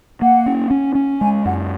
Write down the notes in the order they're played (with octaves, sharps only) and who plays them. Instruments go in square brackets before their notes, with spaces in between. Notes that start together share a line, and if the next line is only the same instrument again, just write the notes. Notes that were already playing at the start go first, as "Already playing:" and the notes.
[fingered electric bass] A#3 [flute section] F#5
[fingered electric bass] C#4
C#4
C#4
[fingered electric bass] G#3 [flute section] G#5
[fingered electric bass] F#2 [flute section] F#5